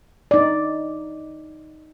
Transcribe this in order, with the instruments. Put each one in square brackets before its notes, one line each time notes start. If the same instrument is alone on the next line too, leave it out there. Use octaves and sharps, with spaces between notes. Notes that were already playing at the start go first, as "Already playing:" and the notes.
[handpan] D#4 D5